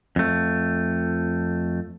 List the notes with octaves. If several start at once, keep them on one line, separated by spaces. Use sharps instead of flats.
F2 A3